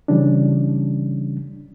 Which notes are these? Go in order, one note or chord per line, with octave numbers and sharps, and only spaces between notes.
C#3 E3 G3 C#4 D4